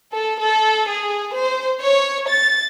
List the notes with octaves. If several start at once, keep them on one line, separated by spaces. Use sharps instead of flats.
A4
A4
G#4
C5
C#5
A6